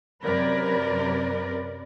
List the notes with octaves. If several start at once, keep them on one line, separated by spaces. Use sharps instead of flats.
F#2 C3 A#4 B4 D5